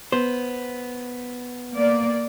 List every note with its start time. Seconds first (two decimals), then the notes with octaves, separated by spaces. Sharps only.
0.12 B3 C5
1.75 A#3 D5